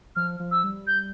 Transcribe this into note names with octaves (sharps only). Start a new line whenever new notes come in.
F3 F6
F3
E6
G3
G6